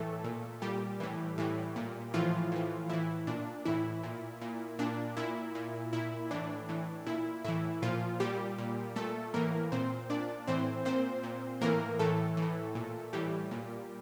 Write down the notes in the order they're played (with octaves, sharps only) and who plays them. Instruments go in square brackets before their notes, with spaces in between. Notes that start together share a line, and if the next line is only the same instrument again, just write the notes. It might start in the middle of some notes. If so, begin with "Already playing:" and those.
Already playing: [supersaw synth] A2 E3 A3 A4
A#2
A#2 G3 G4
A2 E3
A2 E3
A#2
A2 E3 F3 F4
A2 E3
A2 E3 E4
A#2 D4
A2 E3 E4
A#2
A#2
A#2 D4
A#2 E4
A#2
A#2 E4
A2 E3 D4
A2 E3
A#2 E4
A2 E3 E4
A#2 F3 F4
A#2 G3 G4
A#2
A#2 A3 A4
A2 E3 A#3 A#4
A#2 C4 C5
A#2 D4 D5
A2 E3 C4 C5
A#2 C4 C5
A#2
A2 E3 A#3 A#4
A2 E3 A3 A4
E3
A2
A#2
A2 E3 G3 G4
A#2